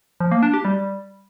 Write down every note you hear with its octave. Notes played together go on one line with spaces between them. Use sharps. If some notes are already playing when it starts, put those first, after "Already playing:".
F3
A#3
D4
G4
G3